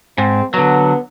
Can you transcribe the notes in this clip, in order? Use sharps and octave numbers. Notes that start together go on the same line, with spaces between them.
G#2 C4
D3 F#3 B3